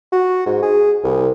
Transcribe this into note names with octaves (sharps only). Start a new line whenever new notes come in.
F#4
G#2
G#4
C2